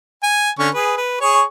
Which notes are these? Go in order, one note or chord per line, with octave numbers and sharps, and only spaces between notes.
G#5
D3 C#4 C#6
G#4 B4
B4
G#4 C#5 C#6